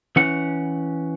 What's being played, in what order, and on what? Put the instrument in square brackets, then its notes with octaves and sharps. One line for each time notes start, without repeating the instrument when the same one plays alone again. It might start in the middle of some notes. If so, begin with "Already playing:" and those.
[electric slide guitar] E3 C#4 F#5